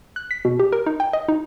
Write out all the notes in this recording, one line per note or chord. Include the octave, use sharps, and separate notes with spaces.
F#6
B6
B2
G4
A#4
D#4
G5
D#5
D#4